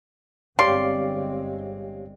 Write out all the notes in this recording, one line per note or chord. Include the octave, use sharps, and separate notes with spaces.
G1 G#3 C4 G4 C#5 D5 F5 C6